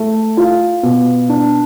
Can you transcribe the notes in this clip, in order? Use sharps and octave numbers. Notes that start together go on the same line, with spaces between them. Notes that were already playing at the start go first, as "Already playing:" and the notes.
Already playing: A3
F4
B2
D4